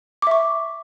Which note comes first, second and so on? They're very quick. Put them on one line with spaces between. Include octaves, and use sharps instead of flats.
D6 E5 C#6